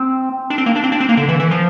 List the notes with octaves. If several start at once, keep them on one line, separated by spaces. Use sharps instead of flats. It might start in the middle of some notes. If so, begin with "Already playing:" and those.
Already playing: C4
D4
C4
A#3
D4
C4
D4
C4
A#3
D3
E3
E3
F3